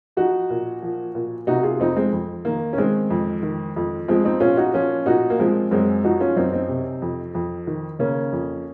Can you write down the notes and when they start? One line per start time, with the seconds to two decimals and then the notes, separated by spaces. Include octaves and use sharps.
0.17 F3 D#4 F#4
0.50 A#2
0.82 F3
1.15 A#2
1.47 C3 D#4 F#4
1.63 F4 G#4
1.80 F2 C4 D#4
1.96 G#3 C4
2.12 F2
2.45 D#3 A#3
2.73 C#4
2.78 D#3 G#3 C4
3.10 F2
3.43 D#3
3.76 F2
4.08 F3 G#3 C4
4.25 C4 D#4
4.40 A#2 C#4 F4
4.57 D#4 F#4
4.74 F3 C#4 F4
5.06 A#2 D#4 F#4
5.30 A#3
5.39 F3 G#3 C4
5.71 F#2 G#3 C4
6.04 F3 D#4 F#4
6.20 C#4 F4
6.36 F#2 C4 D#4
6.53 C4 D#4
6.69 C3
7.02 F2
7.35 F2
7.67 D#3
7.99 C#3 A#3 C#4
8.32 F2